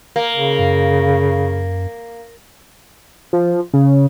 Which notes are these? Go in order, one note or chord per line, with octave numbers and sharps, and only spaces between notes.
A#3
C#3
F#2
F3
C#3